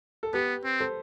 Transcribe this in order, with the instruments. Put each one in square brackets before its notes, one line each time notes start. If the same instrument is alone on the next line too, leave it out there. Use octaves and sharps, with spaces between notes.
[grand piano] A4
[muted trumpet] B3 [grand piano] G4 B4
[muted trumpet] C4
[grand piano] A4 C5